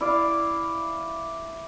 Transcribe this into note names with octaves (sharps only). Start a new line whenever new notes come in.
E4 D5 F5